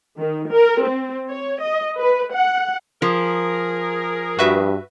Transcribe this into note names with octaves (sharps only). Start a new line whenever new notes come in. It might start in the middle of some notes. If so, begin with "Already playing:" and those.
D#3
A#4
C4
C#5
D#5
B4
F#5
F3 G#4 A#4
G2 F#4 B4 E5